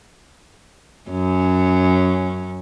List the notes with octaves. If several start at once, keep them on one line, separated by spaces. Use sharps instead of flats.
F#2 C#4